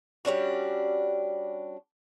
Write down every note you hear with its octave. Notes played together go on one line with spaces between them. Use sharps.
G3 C#4 D4 F#4